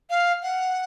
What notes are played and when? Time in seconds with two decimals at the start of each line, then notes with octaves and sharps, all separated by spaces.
0.10 F5
0.43 F#5